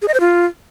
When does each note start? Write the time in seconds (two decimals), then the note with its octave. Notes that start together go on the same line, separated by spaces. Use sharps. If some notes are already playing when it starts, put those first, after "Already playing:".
0.02 G#4
0.08 D#5
0.14 C5
0.20 F4